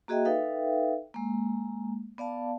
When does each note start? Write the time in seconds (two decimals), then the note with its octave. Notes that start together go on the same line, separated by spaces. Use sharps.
0.08 A#3 F#4 G#4 D#5 E5 G5
0.25 D#4 A4 B4 E5 F5 G5
1.14 G#3 A#3
2.18 B3 D5 F5 A5